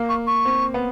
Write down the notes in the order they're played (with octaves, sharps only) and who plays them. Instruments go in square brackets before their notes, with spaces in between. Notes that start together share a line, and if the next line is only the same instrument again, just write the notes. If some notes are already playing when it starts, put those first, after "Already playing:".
Already playing: [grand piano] A#3
[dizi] C#6
C#6
[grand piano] C4
B3